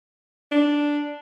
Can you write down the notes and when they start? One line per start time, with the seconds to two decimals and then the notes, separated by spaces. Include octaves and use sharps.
0.52 D4